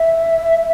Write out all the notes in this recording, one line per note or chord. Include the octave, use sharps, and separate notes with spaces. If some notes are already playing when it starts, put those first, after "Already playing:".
Already playing: E5